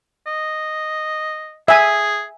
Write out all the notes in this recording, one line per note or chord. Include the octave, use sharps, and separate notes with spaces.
D#5
G#4 E5 G#5